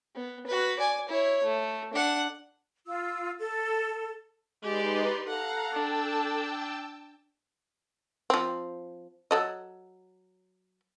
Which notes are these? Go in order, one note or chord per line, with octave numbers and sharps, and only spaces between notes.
B3
F#4 B4
D5 G#5
E4 C#5
A3
D4 F#5
F4 E6
A4
G#3 D#4 G4 B4 D5 C6
A4 F5 F#5 A#5
D4 G5 A5 E6
F3 C4
F#3 A4 D#5